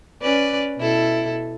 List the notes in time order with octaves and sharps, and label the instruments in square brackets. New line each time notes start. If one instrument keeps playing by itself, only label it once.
[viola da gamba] C#4 B4 D5
B2 E4 A4